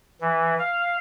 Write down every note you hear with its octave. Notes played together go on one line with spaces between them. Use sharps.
E3
F5